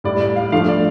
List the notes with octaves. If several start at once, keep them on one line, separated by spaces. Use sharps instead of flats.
A2 G3 D5
D5
F5
G2 F3 A3 F5
D5